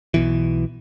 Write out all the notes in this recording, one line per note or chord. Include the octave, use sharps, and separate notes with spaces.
B1 B2 E3